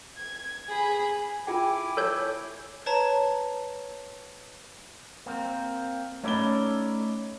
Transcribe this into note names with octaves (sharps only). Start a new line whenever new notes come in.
G#6
G#4 B5
E4 F4 G#4 G5 G#5 D6
A4 C#5 G6
B4 C#5 A5 A#5
A#3 C4
A3 C#4 D#4 A4 C#5 D5 B5 G7